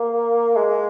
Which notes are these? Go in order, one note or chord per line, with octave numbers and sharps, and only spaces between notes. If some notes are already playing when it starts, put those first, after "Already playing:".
Already playing: A#3
G#3